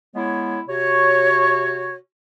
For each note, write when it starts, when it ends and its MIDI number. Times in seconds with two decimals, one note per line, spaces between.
0.15 0.60 56
0.15 0.60 59
0.15 0.60 64
0.15 0.60 73
0.68 1.96 48
0.68 1.96 66
0.68 1.96 73